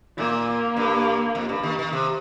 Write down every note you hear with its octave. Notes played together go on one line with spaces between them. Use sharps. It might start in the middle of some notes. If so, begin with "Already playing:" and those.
A#2 A#3
G2
F2
G2
D#3
D#3
C3